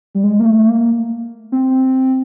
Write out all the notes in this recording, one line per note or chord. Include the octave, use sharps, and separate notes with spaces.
G3
G#3
A#3
A3
A#3
C4